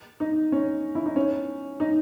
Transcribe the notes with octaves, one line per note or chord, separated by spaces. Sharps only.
D#4
C#4
E4
D#4
C#4
D#4